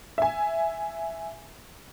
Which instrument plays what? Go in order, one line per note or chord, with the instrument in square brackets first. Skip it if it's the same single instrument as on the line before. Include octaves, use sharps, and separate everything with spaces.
[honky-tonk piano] E5 G#5